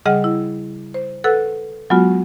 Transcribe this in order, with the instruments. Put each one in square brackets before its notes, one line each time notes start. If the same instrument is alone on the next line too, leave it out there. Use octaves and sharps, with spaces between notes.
[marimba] C#3 G3 G#4 D#5 F#5 F6
E4
C5
A4 B4 F#5 E6 F#6
F#3 G#3 B3 F4 F#4